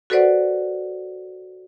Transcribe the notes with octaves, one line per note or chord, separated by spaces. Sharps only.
F#4 A4 B4 C5 D5 F#5